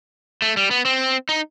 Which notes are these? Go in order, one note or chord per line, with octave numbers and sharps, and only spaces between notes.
A3
G3
B3
C4
D#4